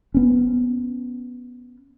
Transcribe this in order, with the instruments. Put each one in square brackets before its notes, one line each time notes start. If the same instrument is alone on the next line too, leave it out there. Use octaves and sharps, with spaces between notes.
[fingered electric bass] B3 C#4